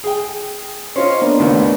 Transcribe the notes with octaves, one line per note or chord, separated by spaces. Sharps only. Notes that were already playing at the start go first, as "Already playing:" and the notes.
G#4 G5
C#4 F4 C5 C#5 D#5
A#3 B3 D4
A1 D#2 A2